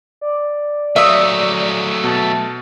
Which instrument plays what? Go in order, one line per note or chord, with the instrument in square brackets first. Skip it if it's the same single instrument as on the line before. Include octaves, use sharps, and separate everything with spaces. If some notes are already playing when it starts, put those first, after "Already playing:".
[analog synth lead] D5
[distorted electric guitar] F#3 A3 [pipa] E5 [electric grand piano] F5 D#6
[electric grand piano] B2 [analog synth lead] A5